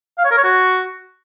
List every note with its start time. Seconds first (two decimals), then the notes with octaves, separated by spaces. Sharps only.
0.18 F5
0.25 C#5
0.31 A#4
0.38 C#5
0.44 F#4